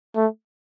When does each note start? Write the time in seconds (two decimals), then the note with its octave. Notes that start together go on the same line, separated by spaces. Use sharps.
0.16 A3